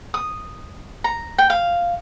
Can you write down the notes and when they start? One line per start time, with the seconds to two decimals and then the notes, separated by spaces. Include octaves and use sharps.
0.14 D#6
1.04 A#5
1.38 G5
1.50 F5